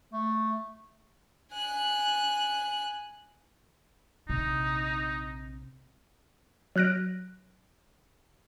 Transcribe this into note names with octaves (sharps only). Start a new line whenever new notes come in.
A3
G#5 F#6
A#1 C3 D#4
F#3 F6 F#6 A#6 D7